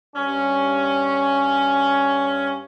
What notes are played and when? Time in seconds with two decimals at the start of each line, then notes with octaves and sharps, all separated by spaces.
0.16 G2 C#4